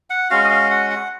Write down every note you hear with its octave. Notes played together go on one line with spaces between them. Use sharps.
F#5
G#3 C#4 F#4 F5
D#5
F5
F#5
F#5